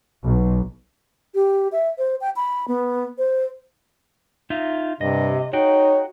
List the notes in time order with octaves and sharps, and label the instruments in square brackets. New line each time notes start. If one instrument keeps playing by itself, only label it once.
[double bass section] B1
[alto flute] G4
E5
C5
G5
B5
B3
C5
[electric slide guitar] D#4 F4 E5
[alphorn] G2 [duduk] C3 [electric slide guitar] D#5
[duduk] D#4 [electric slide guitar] F#4 G#4 G5 [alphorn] C#5